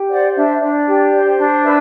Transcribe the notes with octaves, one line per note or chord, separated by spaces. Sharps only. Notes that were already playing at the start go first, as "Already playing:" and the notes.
Already playing: G4
C5 D5 F#5
D4 E5
D4 D5
G4
C5
D4
B4 E5